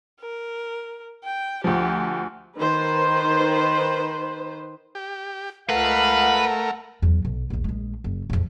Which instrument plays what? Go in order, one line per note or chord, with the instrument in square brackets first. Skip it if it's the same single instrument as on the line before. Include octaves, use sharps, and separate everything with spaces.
[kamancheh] A#4
G5
[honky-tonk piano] D2 F3 [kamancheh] G4
[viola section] D#3 B4 C5
[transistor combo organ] G4
[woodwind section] C#2 F5 [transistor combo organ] A3 A#4 [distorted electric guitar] B4 [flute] F#5
[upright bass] E2 F#3
B1
A#1 E2
A#1 G#3
F#1
A#1 F2